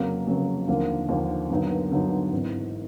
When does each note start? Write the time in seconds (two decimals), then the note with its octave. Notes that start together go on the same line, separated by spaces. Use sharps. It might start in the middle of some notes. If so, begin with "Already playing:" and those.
Already playing: F1 F2 C#3 F#3 A#3
0.27 F1 F2 C#3 F#3 A#3
0.68 D#2 D3 F3 A#3
1.09 D#2 D3 F3 A#3
1.50 G2 D3 F#3 B3 D#4
1.91 G2 D3 F#3 B3 D#4
2.32 G#1 G#2 E3